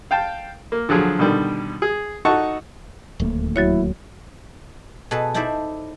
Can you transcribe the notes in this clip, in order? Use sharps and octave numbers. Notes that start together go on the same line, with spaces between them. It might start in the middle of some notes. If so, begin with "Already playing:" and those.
F5 G5 A5
A#3
D3 F3 F#3 G#4
B2 D3 D#3 G3
G#4
D#4 F#4 A4 F#5 A5 C#6
D1 D#2 A3 A#3
F#3 E4 F#4 C#5
B2 G#4 A4 B4 A5
D#4 E4 A4 C5 D5 E5